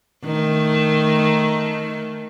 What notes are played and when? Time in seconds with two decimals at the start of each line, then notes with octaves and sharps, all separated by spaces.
0.25 D#3 A3